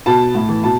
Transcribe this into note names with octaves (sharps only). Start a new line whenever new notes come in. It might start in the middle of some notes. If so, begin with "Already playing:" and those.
B2 A5
A2
E3
B2 A5